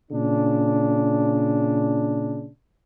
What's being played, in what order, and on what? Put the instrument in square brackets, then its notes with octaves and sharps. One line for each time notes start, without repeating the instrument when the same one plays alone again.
[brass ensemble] A#2 C#3 D4